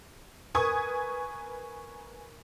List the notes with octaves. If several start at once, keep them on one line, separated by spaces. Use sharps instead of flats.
A#4 B4 G#5 C#6 D#6 G#6